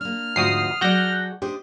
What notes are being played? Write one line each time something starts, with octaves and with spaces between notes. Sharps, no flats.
A#3 D4 F6
D2 G#2 F3 D#4 F#4 D#6 C7
F#3 F#4 G#4 A4 D5 F#6 G6 A#6
D4 G4 C5 D#5